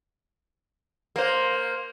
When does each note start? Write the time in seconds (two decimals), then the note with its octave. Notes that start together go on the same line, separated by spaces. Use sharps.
1.16 A#3 C5